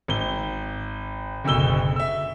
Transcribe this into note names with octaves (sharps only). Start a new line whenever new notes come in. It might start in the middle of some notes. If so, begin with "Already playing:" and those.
G#1 G7
F#1 D2 B2 E6 G7
E5 E6